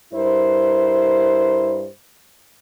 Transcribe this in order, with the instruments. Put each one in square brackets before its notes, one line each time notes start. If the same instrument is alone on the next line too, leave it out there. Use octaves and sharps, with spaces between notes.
[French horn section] G2 E4 A#4 C5